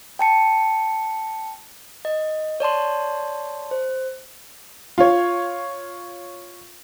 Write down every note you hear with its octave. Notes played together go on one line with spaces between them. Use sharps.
G5 A5 C#7
D#5
C#5 D5 A5 C6
C5
F4 C#5